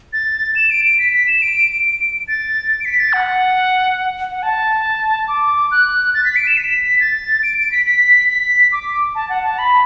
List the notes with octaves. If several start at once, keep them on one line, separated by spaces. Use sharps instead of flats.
A6
E7
D7
D7
B6
B6
E7
D7
D7
A6
D7
B6
A6
F#5
F#5
A5
D6
F#6
A6
B6
D7
E7
B6
A6
D7
D7
B6
B6
B6
D6
A5
F#5
A5
B5